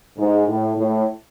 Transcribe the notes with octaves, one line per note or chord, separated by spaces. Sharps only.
G#2
A2
A2